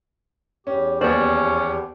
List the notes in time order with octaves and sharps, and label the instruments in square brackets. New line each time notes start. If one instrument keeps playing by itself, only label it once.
[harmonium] E2 G4 [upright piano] C#4
[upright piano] D#2 B3 [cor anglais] C#4 [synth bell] C5 D5